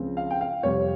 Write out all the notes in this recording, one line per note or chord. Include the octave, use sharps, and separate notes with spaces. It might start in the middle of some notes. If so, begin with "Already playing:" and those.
Already playing: C#2 C#3 F3 C4
F5
G5
F5
F2 C3 G3 C#5